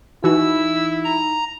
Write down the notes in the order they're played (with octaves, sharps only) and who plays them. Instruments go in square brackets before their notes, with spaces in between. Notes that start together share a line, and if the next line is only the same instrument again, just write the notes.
[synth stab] E3 F#4 [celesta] D#4 [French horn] E4 [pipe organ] E6
[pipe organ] A#5